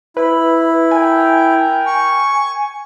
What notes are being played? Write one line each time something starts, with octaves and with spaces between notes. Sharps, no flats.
E4 B4 B5
A#4 G5 G#5
C#6